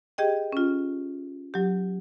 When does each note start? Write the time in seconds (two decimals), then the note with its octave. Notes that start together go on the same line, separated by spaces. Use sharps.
0.18 G4 G#4 D#5 G5
0.52 C#4 F4
1.54 F#3 G4